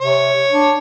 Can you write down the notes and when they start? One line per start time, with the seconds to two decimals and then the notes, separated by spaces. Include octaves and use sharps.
0.01 C3 C#5
0.51 D4